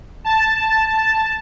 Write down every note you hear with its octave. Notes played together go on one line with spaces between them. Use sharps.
A5